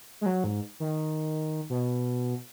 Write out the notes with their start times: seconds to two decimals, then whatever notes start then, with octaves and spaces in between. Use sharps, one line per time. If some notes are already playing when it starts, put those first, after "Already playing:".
0.21 G#3
0.26 F#3
0.44 G#2
0.80 D#3
1.70 B2